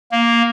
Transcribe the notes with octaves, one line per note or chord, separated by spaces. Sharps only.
A#3